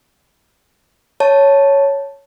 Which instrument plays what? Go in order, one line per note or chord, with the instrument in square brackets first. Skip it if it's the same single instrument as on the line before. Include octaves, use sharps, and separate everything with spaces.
[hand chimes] C#5 A5